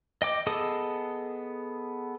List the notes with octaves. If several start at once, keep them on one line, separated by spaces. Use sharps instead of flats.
D#5 G5 D6
B3 G#4 A4 D#5 D#6